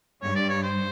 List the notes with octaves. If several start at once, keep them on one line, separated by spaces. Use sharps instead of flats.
G2 C#5
D5
C#5
C5